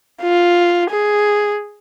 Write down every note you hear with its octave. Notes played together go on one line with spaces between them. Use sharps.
F4
G#4